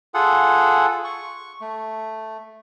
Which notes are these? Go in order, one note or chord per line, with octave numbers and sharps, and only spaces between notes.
F4 G#4 A4 F#5
C#6
A3